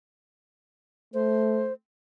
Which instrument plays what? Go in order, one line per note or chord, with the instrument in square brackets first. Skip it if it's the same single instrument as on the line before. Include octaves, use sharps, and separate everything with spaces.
[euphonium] A3 [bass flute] C5